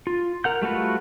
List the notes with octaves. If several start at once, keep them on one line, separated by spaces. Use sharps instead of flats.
F4
A#4 F#5 G6
G3 A3 F4 F#4 B4